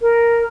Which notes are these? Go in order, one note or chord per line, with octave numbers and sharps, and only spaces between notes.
A#4